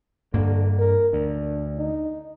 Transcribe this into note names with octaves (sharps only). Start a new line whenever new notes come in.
G2 D3 A#3
A#4
D2 D4
D#4